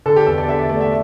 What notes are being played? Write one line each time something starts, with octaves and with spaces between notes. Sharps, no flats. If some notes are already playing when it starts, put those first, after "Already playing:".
D3 A4
G4
E2 A4
D5
D3 E5
D5
A3 D5
E5